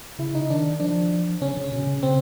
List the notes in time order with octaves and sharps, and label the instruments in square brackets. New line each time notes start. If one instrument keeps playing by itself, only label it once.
[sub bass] C#3 [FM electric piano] E4
[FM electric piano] D#4
[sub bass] D#3 [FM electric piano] D4
[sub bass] F3 [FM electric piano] D4
[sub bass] C#3 [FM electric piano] C#4
[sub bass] C#3
B2
C#3
[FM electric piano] C4